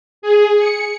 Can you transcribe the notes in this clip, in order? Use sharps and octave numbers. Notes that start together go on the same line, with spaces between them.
G#4
C#7